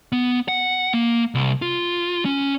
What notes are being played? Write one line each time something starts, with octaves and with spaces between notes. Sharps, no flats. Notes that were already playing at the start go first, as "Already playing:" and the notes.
B3
F#5
A#3
C2
F4
C#4